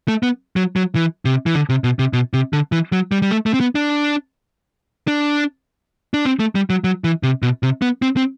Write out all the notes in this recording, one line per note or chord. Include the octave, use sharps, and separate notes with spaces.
A3
B3
F#3
F#3
E3
C3
E3
D3
C3
B2
C3
B2
C3
D3
E3
F#3
G3
G3
A3
A3
C4
B3
D4
D4
D4
C4
A3
G3
F#3
F#3
E3
C3
B2
C3
B3
C4
C4